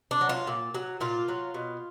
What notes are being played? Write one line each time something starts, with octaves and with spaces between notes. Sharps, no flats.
D4
F#3
F4
A#2
F#3
A#2 F4
F#3
B2